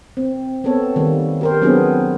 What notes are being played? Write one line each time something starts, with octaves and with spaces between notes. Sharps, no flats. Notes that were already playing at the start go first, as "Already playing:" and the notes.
C4
B3 C4 A4 C#5
D#3 G3 A#3
G4 A#4 C5
F#3 B3 C4 D4 G#4